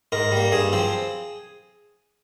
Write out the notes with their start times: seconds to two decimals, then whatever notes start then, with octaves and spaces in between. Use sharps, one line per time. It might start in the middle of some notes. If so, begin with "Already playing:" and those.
0.12 G#2 A#4
0.32 G3 A#3
0.52 G2 G#4
0.73 F3 C4